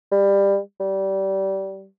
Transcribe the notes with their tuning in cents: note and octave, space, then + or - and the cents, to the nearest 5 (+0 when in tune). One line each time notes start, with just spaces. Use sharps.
G3 +20
G3 -20